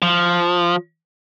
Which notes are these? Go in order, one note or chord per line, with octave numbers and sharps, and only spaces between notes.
F3